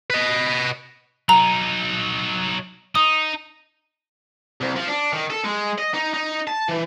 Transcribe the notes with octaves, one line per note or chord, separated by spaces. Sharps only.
B4 D#5
F#3 D#4 A#5
D#4 D#6
C2
F3
D4
D#3
A4
G#3
D#5
D#4
D#4
A5
E3